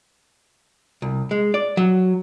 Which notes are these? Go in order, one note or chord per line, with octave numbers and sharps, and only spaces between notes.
C2
G#3
D5
F#3